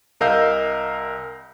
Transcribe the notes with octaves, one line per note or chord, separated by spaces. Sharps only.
C2 A#4 D#5 F5 E6 G6